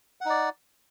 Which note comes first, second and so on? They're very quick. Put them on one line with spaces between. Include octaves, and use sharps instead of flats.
F#5 D#4 D5